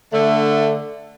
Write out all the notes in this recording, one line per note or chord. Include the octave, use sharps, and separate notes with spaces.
D3 A3